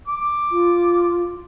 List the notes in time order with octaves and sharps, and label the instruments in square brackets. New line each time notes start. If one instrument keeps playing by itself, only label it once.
[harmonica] D6
[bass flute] F4